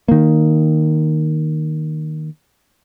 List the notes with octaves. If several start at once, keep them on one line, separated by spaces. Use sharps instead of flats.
D#3 A#3